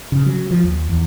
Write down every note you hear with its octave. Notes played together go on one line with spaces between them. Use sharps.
C#3
F#3
F3
D#2
E2